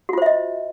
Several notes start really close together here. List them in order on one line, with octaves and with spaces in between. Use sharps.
F#4 F4 C5 E5 D#5